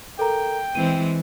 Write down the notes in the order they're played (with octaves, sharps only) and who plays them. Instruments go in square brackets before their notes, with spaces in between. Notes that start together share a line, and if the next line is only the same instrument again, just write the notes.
[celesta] A4 A#4 A#5 [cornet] G5
[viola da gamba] E3 G#3 C4 [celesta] D#7